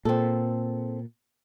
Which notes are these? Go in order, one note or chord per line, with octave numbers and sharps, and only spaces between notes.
A#2 C4 A4